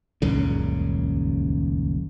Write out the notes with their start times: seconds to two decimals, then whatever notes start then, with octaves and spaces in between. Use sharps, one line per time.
0.22 D#1 C#2 F#2 C#3